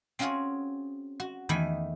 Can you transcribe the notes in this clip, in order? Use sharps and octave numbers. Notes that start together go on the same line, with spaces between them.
C4 C#4 F4 F#4 G#4 C#5
F#4
E2 D#3 E3 A3 G#5 B5